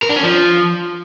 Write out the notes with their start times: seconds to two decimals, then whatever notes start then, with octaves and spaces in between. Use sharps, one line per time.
0.02 A#4
0.09 D4
0.16 C#4
0.23 F3